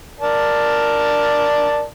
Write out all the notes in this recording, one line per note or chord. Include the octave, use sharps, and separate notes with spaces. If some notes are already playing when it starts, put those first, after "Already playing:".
A#4 D5 A5